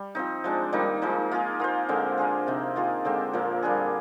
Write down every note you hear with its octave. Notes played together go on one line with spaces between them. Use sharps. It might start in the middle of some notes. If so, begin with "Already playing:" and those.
Already playing: G3
F3 C4 D#4
F3 G#3 D4
D#3 G3 A#3 D#4
F3 G#3 D#4
A#3 F4 G#4
A#3 F4 C5
D3 G#3 C4
A#3 D4 G#4 C5
C3 F3 C4 D#4
D#3 A#3 F4 G#4
D3 G#3 C4 G4
A#2 F3 A#3
G3 D4 G#4